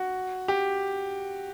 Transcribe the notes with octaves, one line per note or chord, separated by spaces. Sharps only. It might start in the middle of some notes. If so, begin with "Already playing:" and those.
Already playing: F#4
G4